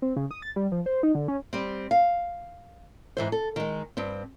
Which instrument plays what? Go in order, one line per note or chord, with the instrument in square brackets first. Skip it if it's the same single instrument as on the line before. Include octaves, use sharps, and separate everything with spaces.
[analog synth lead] C4
C#3
D#6
A6
G3
F3
C5
D#4
D3
C#4
[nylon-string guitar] G3 C4
F5
G#2 E3 C5
A4
D#3 G#3
G2 C4